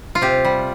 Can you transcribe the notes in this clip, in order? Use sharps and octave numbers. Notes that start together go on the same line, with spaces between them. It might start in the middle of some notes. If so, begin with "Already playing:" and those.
F4
C3 G4
G3